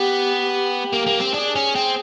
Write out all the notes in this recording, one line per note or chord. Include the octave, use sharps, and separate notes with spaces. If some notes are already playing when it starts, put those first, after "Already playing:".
Already playing: B3 G4
G4
A#3
A#3
C4
D4 G#4
C#4
C4